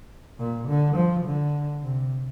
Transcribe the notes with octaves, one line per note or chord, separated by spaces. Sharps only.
A#2
D3
F3
D3
C3